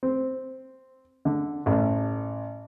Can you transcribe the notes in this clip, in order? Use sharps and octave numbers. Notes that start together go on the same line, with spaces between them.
C4
D3
A1